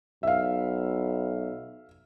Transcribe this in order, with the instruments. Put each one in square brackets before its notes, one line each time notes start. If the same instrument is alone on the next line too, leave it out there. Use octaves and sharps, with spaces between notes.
[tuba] B1 [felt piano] E5 F5